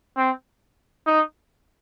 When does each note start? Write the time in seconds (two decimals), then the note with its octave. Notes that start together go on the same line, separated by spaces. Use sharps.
0.17 C4
1.07 D#4